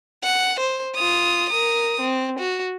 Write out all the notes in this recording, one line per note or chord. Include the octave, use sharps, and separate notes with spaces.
F#5
C5
F4 D#6
A#4 D#6
C4
F#4